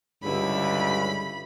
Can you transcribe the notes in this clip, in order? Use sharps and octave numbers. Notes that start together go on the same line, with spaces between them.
C#2 G2 D3 E4 B5